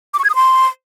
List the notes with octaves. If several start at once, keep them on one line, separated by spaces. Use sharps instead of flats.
D6
C#6
G#6
D#6
C6